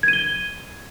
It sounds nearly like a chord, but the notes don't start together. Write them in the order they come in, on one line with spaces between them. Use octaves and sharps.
G#6 D#7 G7